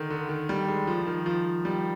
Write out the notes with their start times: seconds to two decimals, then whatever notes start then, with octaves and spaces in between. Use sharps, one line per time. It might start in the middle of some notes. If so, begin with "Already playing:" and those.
Already playing: D3 D#3
0.10 D3
0.29 D#3
0.49 G3
0.68 G#3
0.87 F3
1.06 D#3
1.26 F3
1.65 G3